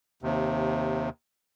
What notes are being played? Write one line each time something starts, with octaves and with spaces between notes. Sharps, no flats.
D#2 C3